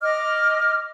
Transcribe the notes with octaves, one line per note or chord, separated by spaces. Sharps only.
D#5 D6 F6